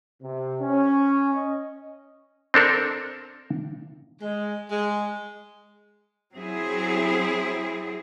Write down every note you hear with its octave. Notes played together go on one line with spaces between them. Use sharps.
C3
C#4
D#5
C4 D4 A4 A#4
G#3
G#3
F#3 C4 E4 G#4